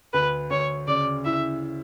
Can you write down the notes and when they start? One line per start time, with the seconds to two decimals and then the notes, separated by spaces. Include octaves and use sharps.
0.13 D2 B4
0.50 D2 C#5
0.87 C#3 D5
1.25 E4 E5